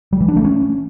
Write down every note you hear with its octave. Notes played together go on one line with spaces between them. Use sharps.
G3
E3
D4
A3
C#4